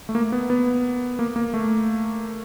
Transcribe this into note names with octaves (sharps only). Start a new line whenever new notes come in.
A3
A#3
B3
B3
A#3
A#3
A3